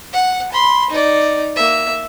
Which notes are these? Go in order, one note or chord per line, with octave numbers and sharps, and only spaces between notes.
F#5
B5 C6
D#4 D5
A#3 E5